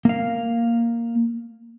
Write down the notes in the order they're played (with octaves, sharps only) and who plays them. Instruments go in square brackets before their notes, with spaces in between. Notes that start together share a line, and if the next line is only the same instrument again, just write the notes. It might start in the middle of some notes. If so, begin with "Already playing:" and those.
[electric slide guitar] A#3 F5